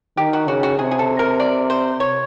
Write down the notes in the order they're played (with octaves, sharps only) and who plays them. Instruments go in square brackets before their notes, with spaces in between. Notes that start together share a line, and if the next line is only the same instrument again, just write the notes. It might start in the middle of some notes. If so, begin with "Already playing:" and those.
[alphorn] D#3 [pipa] G4
[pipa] F#4
[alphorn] C#3 [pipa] F#4
[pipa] F#4
[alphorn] C3 [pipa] G#4
[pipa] G#4
A4
A#4
D5
C5
C#5